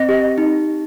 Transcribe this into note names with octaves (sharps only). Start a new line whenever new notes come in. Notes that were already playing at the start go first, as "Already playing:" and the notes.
Already playing: C4 D#5
G4
D#4